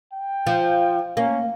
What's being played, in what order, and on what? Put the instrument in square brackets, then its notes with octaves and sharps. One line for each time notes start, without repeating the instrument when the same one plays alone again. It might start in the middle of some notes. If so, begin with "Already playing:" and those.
[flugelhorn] G5
[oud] F3
[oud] A#3 [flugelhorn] C#4